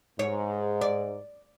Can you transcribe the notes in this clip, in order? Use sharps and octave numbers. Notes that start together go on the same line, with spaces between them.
G#2 C#5
D5